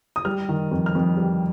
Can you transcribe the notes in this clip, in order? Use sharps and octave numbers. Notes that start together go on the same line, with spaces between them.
D#6
G3 F6
D#3
F2
F6
F2
G3